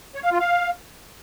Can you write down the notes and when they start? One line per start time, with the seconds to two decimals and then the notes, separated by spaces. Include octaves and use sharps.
0.15 C#5
0.23 F5
0.31 F4
0.40 F5